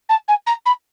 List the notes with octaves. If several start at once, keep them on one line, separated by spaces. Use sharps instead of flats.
A5
G#5
A#5
B5